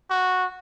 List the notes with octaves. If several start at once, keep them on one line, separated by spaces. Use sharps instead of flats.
F#4